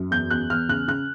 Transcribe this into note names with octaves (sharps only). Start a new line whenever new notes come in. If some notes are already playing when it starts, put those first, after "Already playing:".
Already playing: F#2
E2 G6
E2 F#6
E2 F6
C#3 F#6
C#3 F#6